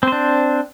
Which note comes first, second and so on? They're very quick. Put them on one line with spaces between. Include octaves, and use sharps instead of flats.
C4 C5 D4